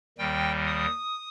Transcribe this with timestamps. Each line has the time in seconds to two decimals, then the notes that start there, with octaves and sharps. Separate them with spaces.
0.18 D#2 D#3 G3 G5
0.67 D#6